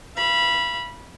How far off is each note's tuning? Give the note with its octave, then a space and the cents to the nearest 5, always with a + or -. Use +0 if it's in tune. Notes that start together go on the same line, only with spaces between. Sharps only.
F5 -45 B5 -20